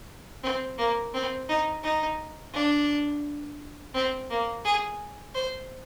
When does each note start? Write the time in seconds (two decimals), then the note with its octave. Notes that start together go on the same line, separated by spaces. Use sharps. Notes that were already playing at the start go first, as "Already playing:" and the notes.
0.43 C4
0.78 A#3
1.14 C4
1.49 D#4
1.83 D#4
2.53 D4
3.94 C4
4.30 A#3
4.65 G#4
5.34 C5